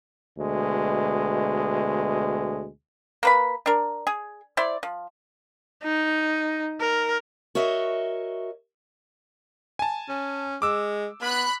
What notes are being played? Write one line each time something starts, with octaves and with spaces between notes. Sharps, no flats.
D2 B2 G#3
A#3 B4 B5
D4 A#4
G#4
E4 C5 D5
F3
D#4
A#4
F#4 A#4 C#5 D#5 E5
G#5 A5
C#4
G#3 D6 E6
B3 B5 F#6